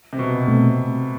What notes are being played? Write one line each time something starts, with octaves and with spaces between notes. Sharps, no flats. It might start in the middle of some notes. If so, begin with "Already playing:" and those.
C3
B2
B2 A3 C4